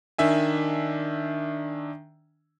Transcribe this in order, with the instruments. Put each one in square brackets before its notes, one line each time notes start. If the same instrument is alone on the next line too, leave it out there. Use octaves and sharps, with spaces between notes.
[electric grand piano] D#3 D4 E5 G#5